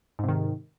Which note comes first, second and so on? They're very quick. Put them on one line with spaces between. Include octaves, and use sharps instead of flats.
G#2 C3 D#3